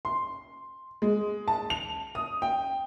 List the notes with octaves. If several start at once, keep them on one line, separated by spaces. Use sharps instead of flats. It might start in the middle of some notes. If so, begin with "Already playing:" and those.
C6
G#3
A5
F7
D#6
G5